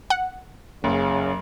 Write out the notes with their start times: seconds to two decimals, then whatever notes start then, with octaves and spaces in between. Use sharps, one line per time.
0.10 F#5
0.84 F#1 C#3